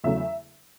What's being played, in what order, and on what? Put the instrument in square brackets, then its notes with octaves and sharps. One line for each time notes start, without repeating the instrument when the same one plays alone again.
[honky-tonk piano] E2 C#3 F#3 A3 E5